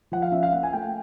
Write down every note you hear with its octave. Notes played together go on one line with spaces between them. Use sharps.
F3 F#5
F5
C#4 E5
F5
A#3 F#5
G#5
A3 G5